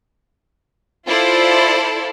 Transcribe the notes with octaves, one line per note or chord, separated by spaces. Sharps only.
E4 F4 A4 C5 D5